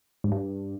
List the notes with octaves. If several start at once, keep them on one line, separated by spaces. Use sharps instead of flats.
G#2
G2